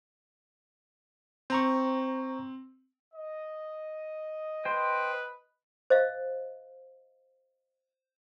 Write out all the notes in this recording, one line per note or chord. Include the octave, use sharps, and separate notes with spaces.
C4 C5 A#5 C#6
D#5
B4 C5 G5
C5 D#5 F5